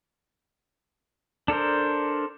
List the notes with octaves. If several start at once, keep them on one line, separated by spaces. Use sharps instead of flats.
D4 A4 A#4 C5